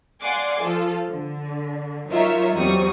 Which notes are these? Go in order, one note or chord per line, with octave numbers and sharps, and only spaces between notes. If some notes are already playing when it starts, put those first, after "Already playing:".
D5 F5 F#5 G#5 C6 D6
F3 F4 A4
D3
F#3 D#4 F4 A#4 C#5 E5
E2 F#3 G3 C4 C#6 D#6